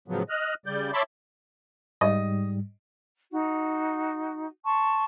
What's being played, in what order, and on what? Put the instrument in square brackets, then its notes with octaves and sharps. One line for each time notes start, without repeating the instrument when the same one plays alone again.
[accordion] A2 C#3 F3 F#3 B3
D#5 F6 F#6
C#3 G3 D5 G6
C#5 E5 A5 B5 C6 D6
[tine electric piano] G#2 G3 [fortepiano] D#5
[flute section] D#4 F#4
A5 C6 C#6